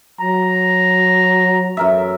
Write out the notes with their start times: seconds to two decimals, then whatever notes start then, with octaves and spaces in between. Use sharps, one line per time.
0.21 F#3 A#5
1.77 F#2 A#4 E5